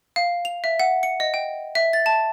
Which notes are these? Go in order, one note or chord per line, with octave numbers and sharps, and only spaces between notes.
F5
F7
E5
F#5
C#7
D#5
G5
E5
A6
A5